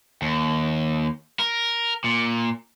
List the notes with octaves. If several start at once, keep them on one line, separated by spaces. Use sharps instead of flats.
D#2
A#4
A#2